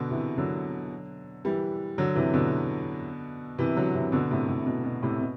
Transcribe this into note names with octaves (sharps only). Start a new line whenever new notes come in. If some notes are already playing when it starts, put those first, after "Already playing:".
Already playing: B2 D3
C3 E3
D3 F#3
E3 G3
D3 F#3
C3 E3
B2 D3
C3 E3
D3 F#3
C3 E3
B2 D3
A2 C3
A2 C3
B2
B2
A2 C3
B2